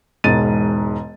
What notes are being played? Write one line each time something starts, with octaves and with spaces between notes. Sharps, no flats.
E1 G#2 A6 D#7